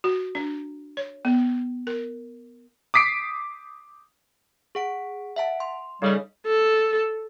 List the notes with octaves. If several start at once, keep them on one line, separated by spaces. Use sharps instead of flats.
F#4
D4
C#5
B3
A#4
D6 D#6 B6 C7 D7
G#4 F#5 D7
E5 F#5 A5
C6
C#3 G3 D#4 A4 D#5
A4